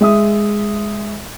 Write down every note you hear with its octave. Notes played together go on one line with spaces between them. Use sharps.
G#3 E5 D#6